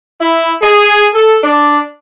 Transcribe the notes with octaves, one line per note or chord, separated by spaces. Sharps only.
E4
G#4
A4
D4